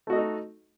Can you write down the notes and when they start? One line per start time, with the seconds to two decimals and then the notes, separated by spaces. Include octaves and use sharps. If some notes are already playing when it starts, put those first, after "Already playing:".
0.07 A3
0.10 F#4
0.13 D#5
0.15 A4
0.18 D#4